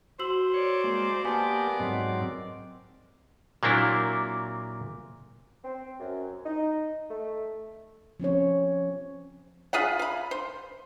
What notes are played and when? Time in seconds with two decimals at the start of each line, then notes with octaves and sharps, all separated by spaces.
0.19 F#4 C5 E6 F#7
0.54 A#4 C#5 D5
0.84 G#3 A#3
1.25 A#3 B3 G4 G#5 A5
1.80 G#2 F#3 C4 D#5
3.63 A#2 F#3 A#3 C4 D4 E4
5.64 C4
5.98 F#2
6.44 D#4
7.09 A3
8.20 F3 C4 C#4 C#5
9.73 F4 G#4 E5 F#5
9.99 F5 B5
10.31 C5